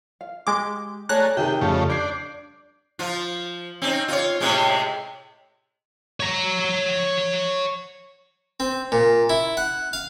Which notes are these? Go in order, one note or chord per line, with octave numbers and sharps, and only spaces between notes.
F5
G#3 G4 D6
A3 G#4 C#5 D5 A#5 F#6
C3 D#3 G#4 E5 G5
F2 C#3 G3 A3
D4 G6 G#6 C7
F3 F4
C4 C#4 D#4
F4 C#5
A2 C3 G#3
C#5 A#5
C4
A#2
E4
F#5
F5